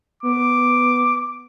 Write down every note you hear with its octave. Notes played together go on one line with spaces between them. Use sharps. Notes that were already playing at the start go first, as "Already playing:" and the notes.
B3 D6